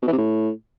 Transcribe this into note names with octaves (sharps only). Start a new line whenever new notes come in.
B2
E3
C3
A2